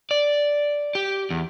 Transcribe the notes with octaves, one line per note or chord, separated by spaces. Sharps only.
D5
G4
E2